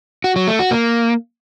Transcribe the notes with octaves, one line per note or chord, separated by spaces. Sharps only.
F#4
F#3
A3
F#4
A#3